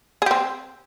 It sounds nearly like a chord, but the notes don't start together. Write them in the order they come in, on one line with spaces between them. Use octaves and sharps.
G#4 G4 C4